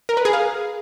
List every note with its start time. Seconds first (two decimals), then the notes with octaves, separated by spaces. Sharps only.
0.09 A#4
0.17 B4
0.25 G#4
0.33 F5